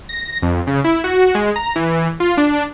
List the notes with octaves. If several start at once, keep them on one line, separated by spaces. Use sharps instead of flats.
A#6
F2
C#3
E4
F#4
G#3
A#5
E3
F4
D4